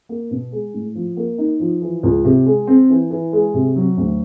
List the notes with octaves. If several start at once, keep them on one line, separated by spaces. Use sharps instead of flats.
A#3
B2
G#3
A2
F3
A#3
D#4
F3
E3
C#2
C3
G#3
C4
E3
E3
G#3
C3
F#3
D2